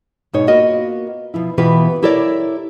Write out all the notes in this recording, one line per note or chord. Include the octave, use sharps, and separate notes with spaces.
G#2 B2 D#4 C#5
A#3 B3 F4 F#4 A#4 D#5
B2 F3 E4
B2 E3 B3 F4 G4 B4
E4 G4 A4 A#4 C#5 D5